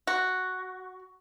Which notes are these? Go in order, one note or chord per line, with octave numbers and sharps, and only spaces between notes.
F#4